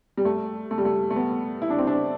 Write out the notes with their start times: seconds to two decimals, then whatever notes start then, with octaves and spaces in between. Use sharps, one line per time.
0.17 G3
0.25 A3
0.71 A3
0.78 G3
0.85 A3
1.10 A3
1.16 B3
1.62 E4
1.70 D4
1.78 C4
1.87 D4